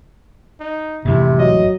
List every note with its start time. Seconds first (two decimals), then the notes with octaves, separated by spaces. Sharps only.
0.60 D#4
1.05 A1 F2 G#2 C3 E4
1.38 F#3 D#5